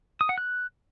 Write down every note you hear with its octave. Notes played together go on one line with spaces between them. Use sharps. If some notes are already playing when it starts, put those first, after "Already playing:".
D#6
F#5
F#6